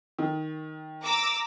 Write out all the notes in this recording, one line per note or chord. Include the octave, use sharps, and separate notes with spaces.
D#3
A#5 D6 E6